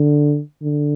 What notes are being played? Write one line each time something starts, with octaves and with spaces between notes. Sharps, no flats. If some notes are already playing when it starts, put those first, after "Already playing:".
Already playing: D3
D3